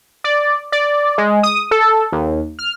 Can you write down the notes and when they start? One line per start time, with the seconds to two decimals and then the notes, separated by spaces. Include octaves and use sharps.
0.24 D5
0.72 D5
1.18 G#3
1.43 D#6
1.71 A4
2.12 D#2
2.59 F6